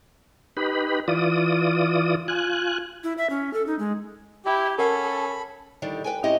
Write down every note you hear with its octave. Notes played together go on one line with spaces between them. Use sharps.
D#4 G4 B4 B5
E3 F4 D5 D#6
F4 G#5 F#6
E4
E5
C#4
A4
D#4
G#3
E4 G4
C#4 A4 A#4 F#5 B5
D3 D#3 G3 D4 G4
B4 G5 G#5
G#2 C4 C#4 E4 G4 D#5